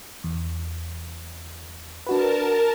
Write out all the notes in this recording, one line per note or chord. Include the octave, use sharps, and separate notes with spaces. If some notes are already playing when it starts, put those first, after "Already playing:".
E2
D4 F#4 A#4 B4 A5